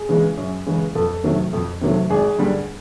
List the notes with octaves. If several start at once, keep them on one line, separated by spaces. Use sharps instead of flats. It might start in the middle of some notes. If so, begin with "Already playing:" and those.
Already playing: G#4
C#3 E3 G#3
F#2
C#3 E3 G#3
F2 A4
C3 D#3 F#3 A3
F2
C3 D#3 F#3 A3
G#1 G#4
G2 D3 G3